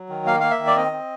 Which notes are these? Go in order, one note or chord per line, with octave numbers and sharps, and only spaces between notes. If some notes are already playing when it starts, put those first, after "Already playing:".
Already playing: F#3
D#3
A#3 F5
A#3 F5
E5
D#3
D5
C4 D#5
C4